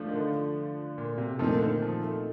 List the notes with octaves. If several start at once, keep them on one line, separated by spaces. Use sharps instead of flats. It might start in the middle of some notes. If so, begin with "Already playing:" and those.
Already playing: F3 A3 D4
D#3
D3
A#2
C3
A#2 F3 A3 C4 D#4 A4
D#3
D3
D#3
F3
A3